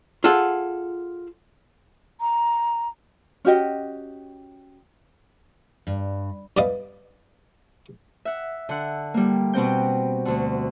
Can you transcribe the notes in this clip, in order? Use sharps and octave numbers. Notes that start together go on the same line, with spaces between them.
F4 G#4 A4 F#5
A#5
C#4 F#4 G4 D#5
G2
G2 G3 B3 D5 D#5 F5
E5 F#5
D3 F#5
G3 A#3
B2 B3 C4 G5
D2 D3